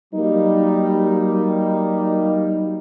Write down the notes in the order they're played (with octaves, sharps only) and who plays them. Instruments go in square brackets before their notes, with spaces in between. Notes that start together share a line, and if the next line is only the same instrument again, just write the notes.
[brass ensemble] F#3 G3 A#3 D#4